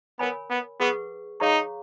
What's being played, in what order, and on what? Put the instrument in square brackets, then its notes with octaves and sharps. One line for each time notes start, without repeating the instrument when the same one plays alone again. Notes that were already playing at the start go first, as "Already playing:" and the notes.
[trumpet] B3 [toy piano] A#4 C#5 G#5 B5
[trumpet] B3
[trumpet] B3 [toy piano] G#4 B4 F#5 C#6
[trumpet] D#4 [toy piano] G#4 C#5 F5 A#5 C#6